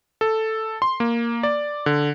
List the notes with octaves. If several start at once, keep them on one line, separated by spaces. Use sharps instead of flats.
A4
C6
A#3
D5
D3